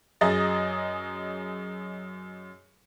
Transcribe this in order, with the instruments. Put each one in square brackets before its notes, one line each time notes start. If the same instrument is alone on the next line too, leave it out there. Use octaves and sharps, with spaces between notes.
[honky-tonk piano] F#2 G#4 D#5 A6